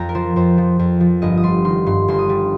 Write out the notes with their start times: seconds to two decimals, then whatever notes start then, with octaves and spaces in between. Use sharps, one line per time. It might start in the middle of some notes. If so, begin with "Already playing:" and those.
Already playing: F2 F5 G5 A#5
0.09 A#4
0.15 F3 C5
0.36 F2 C5
0.58 F3
0.79 F2
1.00 F3
1.22 G1 D#5
1.37 D#6
1.43 G3 C6
1.65 D#3 C6
1.86 G2 C6
2.08 G1 C6
2.19 D#6
2.29 G3